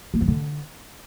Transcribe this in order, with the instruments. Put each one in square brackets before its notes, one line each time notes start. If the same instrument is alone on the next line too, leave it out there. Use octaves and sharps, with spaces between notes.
[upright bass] A#3
E3
D3